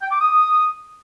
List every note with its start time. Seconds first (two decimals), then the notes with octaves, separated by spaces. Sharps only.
0.01 G5
0.11 D6
0.21 D#6